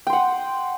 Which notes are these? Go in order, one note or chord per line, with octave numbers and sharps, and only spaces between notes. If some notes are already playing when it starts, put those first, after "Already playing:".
F#5 G5 C6 D#6